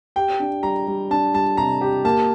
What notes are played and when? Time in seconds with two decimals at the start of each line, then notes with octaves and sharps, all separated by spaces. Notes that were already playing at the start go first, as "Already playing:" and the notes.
0.16 G4 G5
0.40 D4
0.63 G3 A#5
0.88 G3
1.10 D4 A5
1.34 G3 A5
1.57 C3 A#5
1.81 G4
2.04 A#3 A5